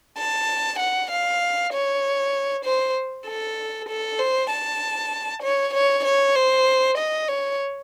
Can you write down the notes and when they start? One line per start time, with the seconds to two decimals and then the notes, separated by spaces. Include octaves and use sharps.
0.18 A5
0.79 F#5
1.11 F5
1.73 C#5
2.65 C5
3.27 A4
3.89 A4
4.19 C5
4.51 A5
5.43 C#5
5.74 C#5
6.05 C#5
6.35 C5
6.98 D#5
7.29 C#5